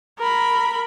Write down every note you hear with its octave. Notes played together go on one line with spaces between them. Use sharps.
A#4 B5